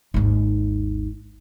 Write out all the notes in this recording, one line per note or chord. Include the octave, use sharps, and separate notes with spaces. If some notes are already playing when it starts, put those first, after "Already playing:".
G#1 D#2